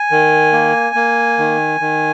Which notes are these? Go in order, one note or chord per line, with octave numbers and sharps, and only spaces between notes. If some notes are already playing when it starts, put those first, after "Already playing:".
Already playing: G#5
D#3
A#3
A#3
D#3
D#3